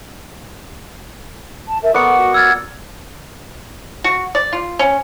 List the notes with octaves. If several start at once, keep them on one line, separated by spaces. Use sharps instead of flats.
A5
A#4 E5
B3 A4 A#4 D5 C#6 D6 C#7
F#4
E6 F6 G#6 A6
F#4
D5
F4
C#4